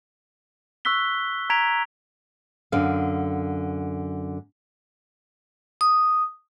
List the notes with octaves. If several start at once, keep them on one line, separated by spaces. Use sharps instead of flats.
C#6 E6 F#6 B6 G7
A#5 G#6 B6 D7 F7
F#2 D3 F5
D#6